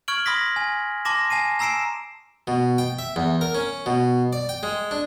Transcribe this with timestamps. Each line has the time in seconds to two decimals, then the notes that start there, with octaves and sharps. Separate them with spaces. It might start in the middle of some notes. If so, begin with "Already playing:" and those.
0.08 C#6 F6 G#6 D7 F#7
0.26 B5 C6 D#6 A#6 B6
0.56 G#5
1.05 A5 C6 D6 A#6 E7
1.30 G#5 A5 C7 D#7
1.59 G#5 A#5 E6 C7 D7 E7
2.47 B2
2.78 G5
2.99 E5
3.16 E2
3.41 A#4
3.55 C#4
3.86 B2
4.33 D5
4.49 G5
4.63 G#3
4.91 D4